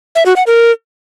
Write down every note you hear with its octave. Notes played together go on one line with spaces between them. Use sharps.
E5
F#4
F#5
A#4